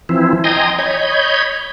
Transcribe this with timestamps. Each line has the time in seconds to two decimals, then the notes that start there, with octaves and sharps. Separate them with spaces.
0.09 E3 F3 C4 E4
0.44 D#5 G5 G#5 A#5 C6 D#6
0.79 C#5 D#5 B5 G6 G#6